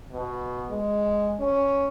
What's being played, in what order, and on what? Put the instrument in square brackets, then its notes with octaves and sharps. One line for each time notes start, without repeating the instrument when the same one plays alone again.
[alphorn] B2
G#3
C#4